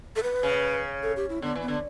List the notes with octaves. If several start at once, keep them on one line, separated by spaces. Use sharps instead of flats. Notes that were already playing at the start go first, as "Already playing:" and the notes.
A4
B4
C#3
A4
G4
E4
D3 B3
E3
B3
D3